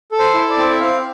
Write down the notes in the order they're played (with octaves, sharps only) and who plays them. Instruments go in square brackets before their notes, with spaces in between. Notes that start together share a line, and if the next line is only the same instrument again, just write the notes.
[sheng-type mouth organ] A4
C5
E4
D5
C4
E5
C4 F5